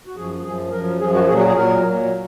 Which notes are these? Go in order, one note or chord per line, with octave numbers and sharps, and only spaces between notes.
F#4
F#2 F3 G#4
F#2 F3 G#4
F#2 F3 A#4
F#2 F3 G#4
F#4
A#2 F#3 G#4
F#4
G#4
A#2 F#3 A#4
A#2 F#3